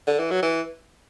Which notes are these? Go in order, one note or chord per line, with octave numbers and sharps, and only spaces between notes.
D3
E3
F#3
E3